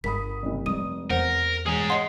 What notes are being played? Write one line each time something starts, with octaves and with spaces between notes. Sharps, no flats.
G1 A#4 B5 D#6 B6
F#1 C2
F1 G3 D#6 D#7
E2 A#4 C5 F#5
E1 G#4 G#5 A#5
C#5 D#5 F#5 C6 C7